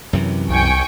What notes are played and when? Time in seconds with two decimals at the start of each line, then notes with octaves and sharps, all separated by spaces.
0.13 F#2 C3 E3
0.49 C2 G5 G#5 C#6